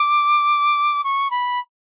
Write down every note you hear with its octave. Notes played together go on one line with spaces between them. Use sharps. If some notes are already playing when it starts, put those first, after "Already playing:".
Already playing: D6
C#6
B5